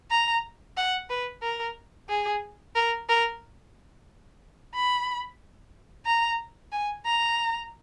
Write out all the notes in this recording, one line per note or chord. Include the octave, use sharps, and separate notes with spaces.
A#5
F#5
B4
A#4
G#4
A#4
A#4
B5
A#5
G#5
A#5